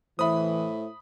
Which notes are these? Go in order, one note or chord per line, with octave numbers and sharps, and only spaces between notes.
A2 E3 C5 E5 B5 D#6